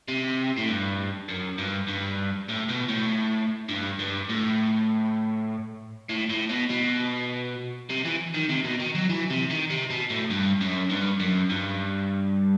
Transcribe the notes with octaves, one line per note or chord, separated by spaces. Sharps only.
C3
A2
G2
F#2
G2
G2
A2
B2
A2
G2
G2
A2
A2
A2
B2
B2
C3
E3
D#3
C3
B2
D#3
F#3
E3
C3
D#3
C3
B2
A2
G2
F#2
G2
F#2
G2